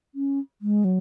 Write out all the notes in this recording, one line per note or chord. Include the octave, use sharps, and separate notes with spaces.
C#4
G#3
F#3